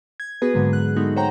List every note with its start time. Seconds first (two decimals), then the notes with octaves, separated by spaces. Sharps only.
0.20 G#6
0.42 B3 F#4 G#4 B4
0.54 G#2 D3 F#3 G#3 A#3
0.73 F#6
0.97 G#3 A3 B3 D#4 F#4
1.16 C5 C#5 F#5 G5 A#5